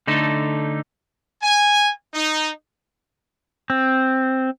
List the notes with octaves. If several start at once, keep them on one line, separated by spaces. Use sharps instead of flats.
D3 A3 D#4 A4
G#5
D#4
C4